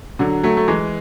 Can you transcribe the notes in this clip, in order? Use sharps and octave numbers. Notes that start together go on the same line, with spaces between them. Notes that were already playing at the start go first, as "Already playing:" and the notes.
D3 F#3
F#3 A3
A3
E3 G#3